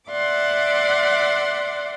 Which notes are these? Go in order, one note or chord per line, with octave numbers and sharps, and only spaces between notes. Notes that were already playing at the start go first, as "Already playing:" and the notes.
D5 E5 F#5 C6 D6